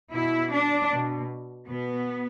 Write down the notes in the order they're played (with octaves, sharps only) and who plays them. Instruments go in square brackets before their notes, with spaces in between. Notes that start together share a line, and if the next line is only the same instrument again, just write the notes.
[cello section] B2 E4
D4
B2
B2 B3